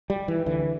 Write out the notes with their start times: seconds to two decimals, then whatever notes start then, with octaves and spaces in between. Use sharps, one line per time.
0.10 G3
0.28 E3
0.46 D2 D3 E3